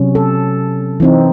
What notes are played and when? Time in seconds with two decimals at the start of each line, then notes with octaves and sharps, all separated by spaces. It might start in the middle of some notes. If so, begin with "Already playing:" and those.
Already playing: C3 F#3 C#4
0.15 A4
1.00 E3 C4 D#4